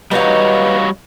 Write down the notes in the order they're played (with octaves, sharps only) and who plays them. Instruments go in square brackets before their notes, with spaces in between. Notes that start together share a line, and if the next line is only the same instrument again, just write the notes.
[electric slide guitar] G3 F#4 C#5 [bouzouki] D#4 F5 [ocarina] B4